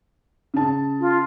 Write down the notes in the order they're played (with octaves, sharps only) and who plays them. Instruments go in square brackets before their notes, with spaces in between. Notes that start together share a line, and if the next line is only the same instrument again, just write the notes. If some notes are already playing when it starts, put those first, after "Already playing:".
[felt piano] C#3 A5
[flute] F4